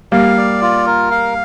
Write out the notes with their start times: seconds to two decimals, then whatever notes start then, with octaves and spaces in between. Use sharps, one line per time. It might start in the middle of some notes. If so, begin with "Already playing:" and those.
0.12 G3 A#3 F5
0.38 D5
0.61 F4
0.86 A#4
1.11 F5